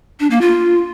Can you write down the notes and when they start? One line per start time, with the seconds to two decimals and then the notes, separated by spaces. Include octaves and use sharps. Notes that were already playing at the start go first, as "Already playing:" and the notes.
0.20 D4
0.30 A#3
0.41 F4